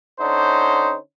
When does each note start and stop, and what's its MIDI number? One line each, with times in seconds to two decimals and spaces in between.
0.20 0.96 50
0.20 0.96 61
0.20 0.96 63
0.20 0.96 72